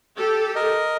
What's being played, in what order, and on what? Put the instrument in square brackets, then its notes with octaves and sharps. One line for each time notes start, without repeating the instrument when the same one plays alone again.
[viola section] G4 A4
[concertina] A#4 D#5